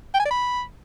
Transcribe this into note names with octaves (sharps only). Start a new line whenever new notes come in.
G5
G#5
D5
B5